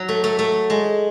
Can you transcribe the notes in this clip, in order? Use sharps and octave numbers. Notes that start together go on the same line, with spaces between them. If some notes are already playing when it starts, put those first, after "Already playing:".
Already playing: F#3
A3
A3
A3
G#3